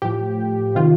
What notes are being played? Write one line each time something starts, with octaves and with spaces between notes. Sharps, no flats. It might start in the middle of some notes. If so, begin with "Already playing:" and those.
A2 F3 G4
C3 D#3 F4